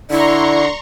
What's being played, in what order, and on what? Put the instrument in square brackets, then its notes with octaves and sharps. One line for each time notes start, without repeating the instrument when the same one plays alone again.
[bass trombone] D3 [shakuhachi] E4 [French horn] D5 [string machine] A#5 C6 C#6